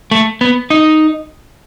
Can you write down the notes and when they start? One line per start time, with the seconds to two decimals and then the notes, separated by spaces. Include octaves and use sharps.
0.11 A3
0.41 B3
0.70 D#4